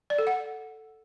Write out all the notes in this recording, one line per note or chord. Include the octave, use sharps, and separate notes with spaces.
D5
A4
F#5